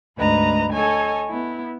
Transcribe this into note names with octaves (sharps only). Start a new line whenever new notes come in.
D2 G#2 B4 D#5 A#5
A4 C#5 D#5 G#5
B3 E4